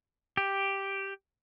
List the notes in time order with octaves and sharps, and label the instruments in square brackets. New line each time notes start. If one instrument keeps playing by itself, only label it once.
[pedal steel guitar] G4